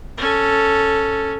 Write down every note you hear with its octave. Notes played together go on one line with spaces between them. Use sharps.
C#4 A4